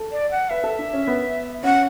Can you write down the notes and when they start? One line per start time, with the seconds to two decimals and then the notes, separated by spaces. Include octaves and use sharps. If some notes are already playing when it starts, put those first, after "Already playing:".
Already playing: A4
0.12 D5
0.31 F#5
0.50 B4 E5
0.64 A4
0.79 D4
0.93 C#4
1.07 B3
1.63 C#4 F#5